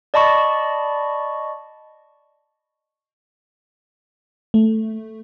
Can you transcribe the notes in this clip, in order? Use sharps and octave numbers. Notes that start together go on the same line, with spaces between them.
D5 D#5 A5 B5 C#6
A3